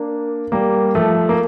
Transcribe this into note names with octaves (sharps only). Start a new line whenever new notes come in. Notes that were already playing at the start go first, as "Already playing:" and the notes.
Already playing: A#3 D4
G3 A#3
F3 A3
A#3